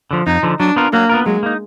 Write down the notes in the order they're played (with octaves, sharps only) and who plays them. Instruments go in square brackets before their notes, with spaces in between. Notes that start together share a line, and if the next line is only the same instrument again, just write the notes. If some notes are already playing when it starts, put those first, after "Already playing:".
[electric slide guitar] D3 F3
[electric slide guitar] F2 [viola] D#4
[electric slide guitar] D3 F3
[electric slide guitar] F#3 [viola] D4
[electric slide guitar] B3 F4 A#4
[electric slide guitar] F#3 [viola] A#3
[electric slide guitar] B3 F4 A#4
[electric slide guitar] F#3 [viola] G#3
[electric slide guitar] A#3 D#4